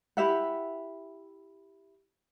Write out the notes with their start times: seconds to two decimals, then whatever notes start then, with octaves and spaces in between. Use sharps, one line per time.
0.17 E4 G4 E5 F#5